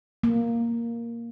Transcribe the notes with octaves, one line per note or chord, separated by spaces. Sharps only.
A#3